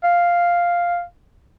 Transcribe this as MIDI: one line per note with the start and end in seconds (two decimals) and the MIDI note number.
0.03 1.02 77